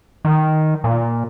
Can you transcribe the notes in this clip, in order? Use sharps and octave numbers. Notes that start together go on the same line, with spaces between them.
D#3
A#2